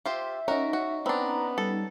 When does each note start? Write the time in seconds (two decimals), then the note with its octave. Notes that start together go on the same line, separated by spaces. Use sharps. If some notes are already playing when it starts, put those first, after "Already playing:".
0.06 F4 G4 C5 E5
0.48 C#4 D#4 F#4 A#4
0.73 F#4
1.06 B3 C4 D4 A#5
1.58 G3 A4